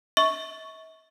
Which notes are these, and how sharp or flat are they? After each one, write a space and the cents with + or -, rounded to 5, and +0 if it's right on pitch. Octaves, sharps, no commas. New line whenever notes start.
E5 -45 C#6 +0